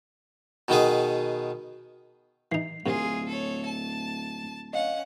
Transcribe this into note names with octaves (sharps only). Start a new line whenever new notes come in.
B2 D#3 B3 G#4
E3 D#4 C7
D1 F#2 C3 F4 G#4
A4 C#5
A5
C#4 D#5 F5 F#5